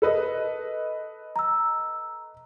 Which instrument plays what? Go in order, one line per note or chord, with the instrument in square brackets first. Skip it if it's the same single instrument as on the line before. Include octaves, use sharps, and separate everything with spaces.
[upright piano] A4 B4 D#5
[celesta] A#5 E6